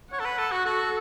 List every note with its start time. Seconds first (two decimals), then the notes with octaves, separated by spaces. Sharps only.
0.12 C#5 F#5
0.20 A4
0.25 B4
0.39 A4
0.52 F#4
0.65 F#4 A4